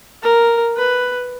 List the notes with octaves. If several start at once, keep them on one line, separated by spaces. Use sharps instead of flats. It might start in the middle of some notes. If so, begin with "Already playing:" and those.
A#4
B4